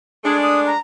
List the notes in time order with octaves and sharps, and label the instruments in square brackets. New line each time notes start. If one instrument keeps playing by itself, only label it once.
[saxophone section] G#3 A3 D4 [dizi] G#4
[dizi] D#6
A#5